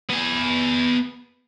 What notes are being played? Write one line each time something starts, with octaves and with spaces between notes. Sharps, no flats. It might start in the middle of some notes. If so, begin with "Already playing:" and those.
B3 G#5